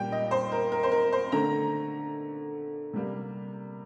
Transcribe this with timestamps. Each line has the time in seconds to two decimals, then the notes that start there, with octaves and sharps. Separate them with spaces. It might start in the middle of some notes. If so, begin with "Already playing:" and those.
Already playing: A#2 G3 A#3 G5
0.12 D#5
0.31 C5
0.52 A#4
0.72 A#4
0.83 C5
0.92 A#4
1.12 C5
1.32 D3 A3 A#5
2.93 C3 G3 A#3